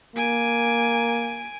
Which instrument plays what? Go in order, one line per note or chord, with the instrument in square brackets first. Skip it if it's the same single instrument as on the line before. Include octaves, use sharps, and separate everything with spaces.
[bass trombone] A#3 [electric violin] G#5 D7